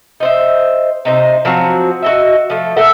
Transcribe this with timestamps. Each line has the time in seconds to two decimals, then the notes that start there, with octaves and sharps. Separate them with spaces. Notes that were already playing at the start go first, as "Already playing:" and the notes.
0.20 D#4 C5 E5
1.05 C3 D#4 C5
1.45 F3 F#3 C4 F#4
2.02 F#4 D#5 E5
2.50 F3 A3
2.77 A4 A#4 E5 F#5